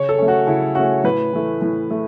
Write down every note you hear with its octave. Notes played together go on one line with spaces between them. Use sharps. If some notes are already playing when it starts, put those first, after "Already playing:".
Already playing: C#3 C#5
A4
A3 C#4
F#4
C#3 E4
A3 C#4 F#4
A2 B4
E3 A3
A2
A3